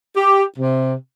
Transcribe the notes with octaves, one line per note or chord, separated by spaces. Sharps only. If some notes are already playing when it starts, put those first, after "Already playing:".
G4
C3